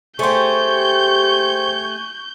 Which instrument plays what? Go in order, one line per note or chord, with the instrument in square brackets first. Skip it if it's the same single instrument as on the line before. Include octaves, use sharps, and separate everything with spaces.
[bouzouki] A3 G4 [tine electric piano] G#4 C5 C6 [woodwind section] G#5 C#6 [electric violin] G6